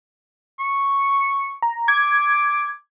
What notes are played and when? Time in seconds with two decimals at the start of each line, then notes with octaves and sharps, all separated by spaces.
0.59 C#6
1.62 A#5
1.88 D6 G#6